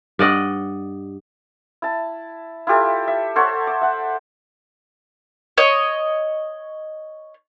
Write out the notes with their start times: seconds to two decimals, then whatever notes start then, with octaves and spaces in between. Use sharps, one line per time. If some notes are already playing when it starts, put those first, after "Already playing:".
0.19 G2 D5 D#5 F#5
1.82 E4 A5
2.67 E4 F4 G4 A4
3.07 E5
3.36 A4 C5 C#5 F#5
3.67 D6
3.82 E5 F#5
5.58 C#5 D#5